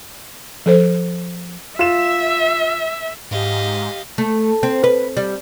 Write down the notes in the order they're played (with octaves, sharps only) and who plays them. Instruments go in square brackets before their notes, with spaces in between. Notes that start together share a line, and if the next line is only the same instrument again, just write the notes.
[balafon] F3 A4 C5
[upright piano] F4 E7 [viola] E5
[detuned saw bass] G#2 [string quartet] G4 D#5 F5
[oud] A3
C4
B4
G3